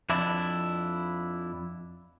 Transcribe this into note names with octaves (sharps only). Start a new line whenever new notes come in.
F2 D4 E4